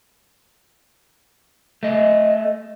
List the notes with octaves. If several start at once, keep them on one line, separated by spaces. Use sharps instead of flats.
A3 D#5